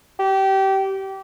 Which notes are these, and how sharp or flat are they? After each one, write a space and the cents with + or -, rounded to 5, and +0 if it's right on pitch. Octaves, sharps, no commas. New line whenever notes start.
G4 -25